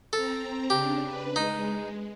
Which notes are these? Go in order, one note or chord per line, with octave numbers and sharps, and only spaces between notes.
C4 A4 A#5
C#3 D4 G4
B4
G#3 D#4